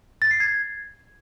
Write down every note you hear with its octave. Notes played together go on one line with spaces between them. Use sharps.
A6
C7
G#6